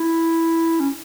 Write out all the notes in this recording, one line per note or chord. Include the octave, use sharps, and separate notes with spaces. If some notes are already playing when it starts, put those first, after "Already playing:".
Already playing: E4
C#4